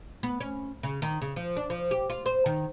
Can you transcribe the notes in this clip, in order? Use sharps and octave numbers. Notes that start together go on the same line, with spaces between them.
B3
C#4
C#3
D#3
C#3
F3
D4
F3
G4
F4
C5
D#3